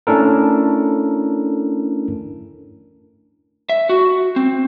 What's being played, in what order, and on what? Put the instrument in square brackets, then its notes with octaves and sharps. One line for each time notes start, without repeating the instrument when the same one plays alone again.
[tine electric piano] A3 C#4 D4 E4 A4 A#4
[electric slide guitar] E5
F#4
C4